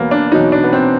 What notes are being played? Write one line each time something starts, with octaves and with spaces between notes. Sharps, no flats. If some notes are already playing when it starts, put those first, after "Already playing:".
Already playing: E2 B2 F#3 A#3 B3
D4
E2 B2 F#3 D#4
D4
B3
C4